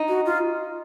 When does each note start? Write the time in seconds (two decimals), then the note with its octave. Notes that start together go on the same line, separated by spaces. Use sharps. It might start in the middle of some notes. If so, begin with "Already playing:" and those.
Already playing: D#4
0.08 F#4
0.26 F4